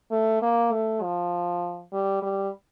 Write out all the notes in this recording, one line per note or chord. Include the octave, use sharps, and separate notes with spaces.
A3
A#3
A3
F3
G3
G3